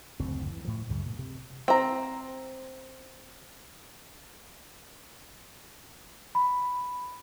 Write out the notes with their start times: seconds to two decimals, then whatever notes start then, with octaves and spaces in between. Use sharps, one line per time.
0.20 F#1 D2 A2 C4
0.47 E3
0.65 A2 F3
0.89 C#2 F#2 C#3
1.06 A#2
1.19 C3
1.68 C4 A#5
6.35 B5